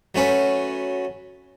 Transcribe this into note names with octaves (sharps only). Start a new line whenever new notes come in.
F#3 A3 C#4 B4